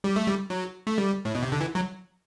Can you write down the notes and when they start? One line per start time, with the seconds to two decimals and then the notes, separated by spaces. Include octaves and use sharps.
0.04 G3
0.16 A3
0.27 G3
0.50 F#3
0.87 A3
0.98 G3
1.25 A2
1.35 B2
1.43 C3
1.52 D3
1.61 E3
1.75 F#3